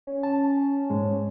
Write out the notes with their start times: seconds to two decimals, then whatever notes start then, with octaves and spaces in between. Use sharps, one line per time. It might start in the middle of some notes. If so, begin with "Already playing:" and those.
0.07 C#4
0.23 A5
0.90 G#2 G#3